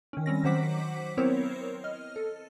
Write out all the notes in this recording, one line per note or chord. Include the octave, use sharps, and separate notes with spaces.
D#3 C#4
G3 C4 C#4 A#6
D#3 F#3 C5 F#5 D6 B6
B3 C4 E4 A#4 C5 C#5
D#5 F6
A4